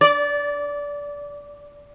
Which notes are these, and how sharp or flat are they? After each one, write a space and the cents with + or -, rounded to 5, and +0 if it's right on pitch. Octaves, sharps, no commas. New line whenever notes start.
D5 -20